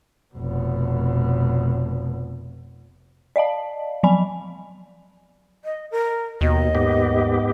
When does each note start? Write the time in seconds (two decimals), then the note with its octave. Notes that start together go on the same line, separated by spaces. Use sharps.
0.34 F1 B2
3.36 D5 D#5 F5 A5
4.03 F3 F#3 D5 G#5 B5
5.65 D#5
5.91 A#4
6.41 D#2 B2 D#5
6.75 G#2 B3 G4